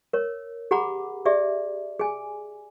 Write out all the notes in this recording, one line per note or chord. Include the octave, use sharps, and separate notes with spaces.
A#4 C#5
G4 G#4 F#5 A#5 B5 D6
G4 G#4 D5 E5
G#4 G#5